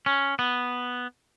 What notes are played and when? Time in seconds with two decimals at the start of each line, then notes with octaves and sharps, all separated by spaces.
0.06 C#4
0.39 B3